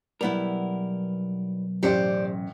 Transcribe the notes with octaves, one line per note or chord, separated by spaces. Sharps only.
B1 G3 B3 E4 A#4
A1 F#2 G4 C5 D5 C#7